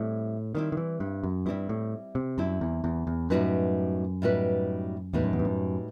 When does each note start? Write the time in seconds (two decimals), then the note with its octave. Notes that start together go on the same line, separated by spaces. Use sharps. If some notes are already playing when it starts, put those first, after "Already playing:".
Already playing: A2 G3 C4 E4
0.55 D#3 G3 C4 E4
0.72 D#3
0.77 E3
1.00 G2
1.23 F#2
1.46 G2 G3 C4 E4
1.69 A2
2.15 C3
2.38 F#2 G3 C4 E4
2.61 E2
2.84 E2
3.07 E2
3.30 F#2 A2 G3 D#4 F#4 B4
4.22 A2 G3 D#4 F#4 B4
5.13 E2 A2 G3 D#4 F#4 B4
5.24 F#2
5.33 E2
5.39 G2
5.45 F#2